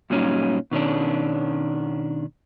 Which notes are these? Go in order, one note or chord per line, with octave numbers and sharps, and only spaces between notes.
G2 A#2 F#3 C#4 D#4
B2 D#3 C#4 D4